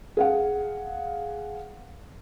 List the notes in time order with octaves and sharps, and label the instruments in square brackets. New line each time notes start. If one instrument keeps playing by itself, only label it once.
[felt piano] G#4 F5 F#5